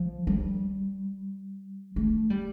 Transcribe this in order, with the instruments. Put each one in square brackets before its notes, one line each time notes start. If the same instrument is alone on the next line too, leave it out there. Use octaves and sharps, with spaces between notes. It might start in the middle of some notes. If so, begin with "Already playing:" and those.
Already playing: [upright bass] F3
G3
A3
G3